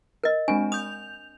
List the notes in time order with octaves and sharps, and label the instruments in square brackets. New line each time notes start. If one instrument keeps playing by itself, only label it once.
[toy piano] A#4 D#5
[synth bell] G#3 C4 D4 [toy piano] G#5
[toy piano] D#6 [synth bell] G6 F7